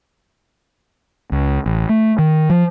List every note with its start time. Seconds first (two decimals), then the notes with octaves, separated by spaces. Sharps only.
1.32 C#2
1.66 A1
1.89 A3
2.19 D#3
2.50 F3